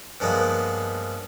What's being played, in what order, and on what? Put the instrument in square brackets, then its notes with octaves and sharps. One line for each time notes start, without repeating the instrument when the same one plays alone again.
[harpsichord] G2 F3 G#3 A#3 B3